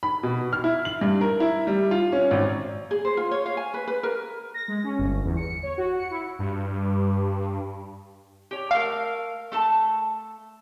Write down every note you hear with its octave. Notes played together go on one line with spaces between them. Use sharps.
B5
B2
F6
E4
F#7
G2
A#4
E4
G3
F4
C#4
G#1
G#4
C5
F4
C#5
F5
G#5
B4
B4
A#4
A#6
G#3
C#4
G1
E2
C#7
C#5
F#4
C#7
E4
G2
G4 C#5
A3 A#4 F5
A3 A4 A5